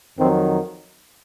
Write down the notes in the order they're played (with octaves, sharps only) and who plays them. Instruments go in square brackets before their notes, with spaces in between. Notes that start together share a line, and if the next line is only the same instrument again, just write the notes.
[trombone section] F2 D#3 F#3 C4